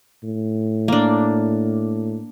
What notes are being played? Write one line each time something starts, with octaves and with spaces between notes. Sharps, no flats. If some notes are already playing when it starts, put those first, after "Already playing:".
A2
A#3 D4